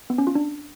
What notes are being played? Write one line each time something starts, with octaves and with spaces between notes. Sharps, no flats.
B3
C#4
F4
D4